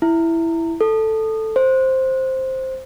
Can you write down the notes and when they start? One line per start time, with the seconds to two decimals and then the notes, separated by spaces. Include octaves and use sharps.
0.02 E4
0.81 A4
1.56 C5